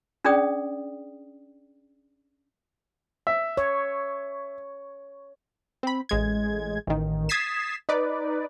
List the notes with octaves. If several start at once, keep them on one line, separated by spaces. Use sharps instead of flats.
C#4 D4 G#4 D5 G5 D#6
E5
C#5
C4 B5
A1 G#3 G#6
A1 D#3
D#6 G#6 A6 B6 C7 E7
D#4 B4 D5